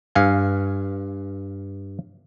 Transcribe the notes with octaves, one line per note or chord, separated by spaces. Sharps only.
G2 F5 G#5